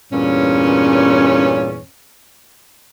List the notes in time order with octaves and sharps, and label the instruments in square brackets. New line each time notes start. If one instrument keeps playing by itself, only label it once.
[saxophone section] E2 G2 A#2 C#4